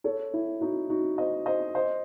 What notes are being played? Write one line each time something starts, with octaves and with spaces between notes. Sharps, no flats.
A4 C#5
E4
D#4 F#4
D#4 F#4
C5 D#5
C5 D#5
C5 D#5